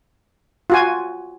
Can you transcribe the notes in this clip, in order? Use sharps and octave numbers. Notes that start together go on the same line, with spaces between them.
F4 F#4 G#5